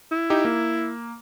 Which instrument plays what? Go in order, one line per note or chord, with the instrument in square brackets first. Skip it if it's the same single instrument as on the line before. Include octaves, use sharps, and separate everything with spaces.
[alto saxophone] E4
[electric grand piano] D#4 G4
A#3